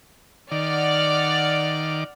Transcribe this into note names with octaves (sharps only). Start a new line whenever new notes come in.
D#3 D5 F#5 D6 F6